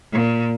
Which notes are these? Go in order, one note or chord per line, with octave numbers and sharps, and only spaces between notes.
A#2